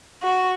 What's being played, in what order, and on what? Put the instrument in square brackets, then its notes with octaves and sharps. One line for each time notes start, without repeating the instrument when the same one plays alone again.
[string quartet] F#4